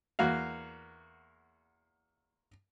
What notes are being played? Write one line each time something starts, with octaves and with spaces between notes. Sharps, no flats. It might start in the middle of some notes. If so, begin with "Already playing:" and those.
E2 A#3 F#4 F5